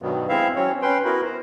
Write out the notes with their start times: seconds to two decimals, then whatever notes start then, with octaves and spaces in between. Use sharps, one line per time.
0.02 G2 B2 D#3 F#3 G3 B3
0.29 G#3 C4 E4 E5 F5
0.56 F#3 C4 C#4 C#5
0.82 C#4 B4 G5 C6
1.05 B3 E4 F#4 A#4 B4
1.25 C5